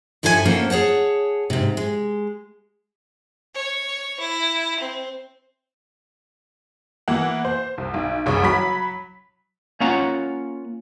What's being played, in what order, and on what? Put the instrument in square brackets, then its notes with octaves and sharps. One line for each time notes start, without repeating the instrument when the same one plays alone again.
[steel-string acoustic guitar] G2 F3 E4 A4 B4 G#5
F#3 A#3 C#4 A4 A#4 C5
G#4 C#5 F#5 A5
G#2 C3
G#3
[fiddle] C#5
E4
C4
[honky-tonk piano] E3 A#3 B3 F#5
C5
C2
B1
F#1 C2 C#3 C#6
F#3 B5 B6
[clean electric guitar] A#3 C#4 F4 C#5 F#5 A#5